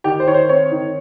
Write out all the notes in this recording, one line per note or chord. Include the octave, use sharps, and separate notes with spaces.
D#3 G4
C5
D#3 C#5
C5
C4 C#5
D#3